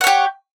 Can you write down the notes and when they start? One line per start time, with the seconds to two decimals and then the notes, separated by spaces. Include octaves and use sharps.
0.01 F#5
0.04 C#5
0.07 G4